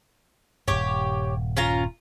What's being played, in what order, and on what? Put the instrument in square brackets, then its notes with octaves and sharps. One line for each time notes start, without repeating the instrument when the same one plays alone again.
[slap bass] D#1 G2 [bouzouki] G4 C#5
[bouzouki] C#4 F4 A#5